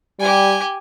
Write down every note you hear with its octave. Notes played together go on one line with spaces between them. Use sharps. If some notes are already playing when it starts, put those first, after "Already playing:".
G3 G4 G#5